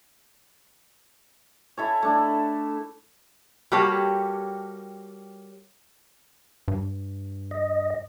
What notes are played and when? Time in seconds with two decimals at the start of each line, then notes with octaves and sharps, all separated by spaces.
1.77 E4 A4 C#5
2.02 A3 D4
3.72 G3 A#3 F#4 G4 A4 C#5
6.68 G2
7.51 D#5